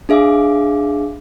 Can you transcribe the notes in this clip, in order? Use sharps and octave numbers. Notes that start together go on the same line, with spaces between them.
D4 G#4 E5 F5 D6